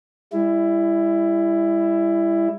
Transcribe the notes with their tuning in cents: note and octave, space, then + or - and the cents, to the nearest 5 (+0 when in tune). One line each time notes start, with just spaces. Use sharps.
G3 +45 E4 +15